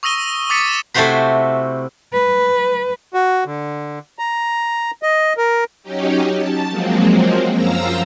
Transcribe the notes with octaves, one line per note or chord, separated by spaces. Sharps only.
C#6 D#6 E6 A#6 D#7 G7
D6 D#6 A6 B6 C#7 D#7
E7
C3 A3 E4 F#4 C5 B5
B4
F#4
D3
A#5
D#5
A#4
F#3 C#4 D#4 G4
A5
F3 F#3 G#3 A#3 C4
F#2 F3 F4 A#5 E6 A#6